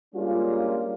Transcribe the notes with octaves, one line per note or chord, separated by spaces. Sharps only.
G3 G#3 A#3 C#4 D4 F4